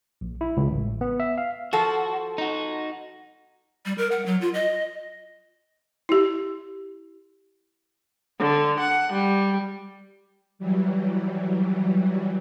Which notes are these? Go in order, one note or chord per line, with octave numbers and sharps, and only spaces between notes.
A#1
E4
C#2
A1
B3
E5
F5
F3 F#4 A4
D#4 F#4
G3
A#4
F#5
F#3
F4
D#5
E4 G4
D3
F#5
G3
E3 F#3 G3